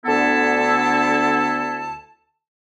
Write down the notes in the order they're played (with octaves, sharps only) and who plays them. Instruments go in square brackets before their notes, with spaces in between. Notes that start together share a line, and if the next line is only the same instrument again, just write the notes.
[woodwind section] D2 D3 B3 E4 A4 A5